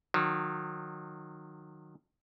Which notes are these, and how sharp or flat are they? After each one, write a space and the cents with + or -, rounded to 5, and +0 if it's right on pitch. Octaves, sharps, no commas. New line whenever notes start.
D#3 -30 F#3 -30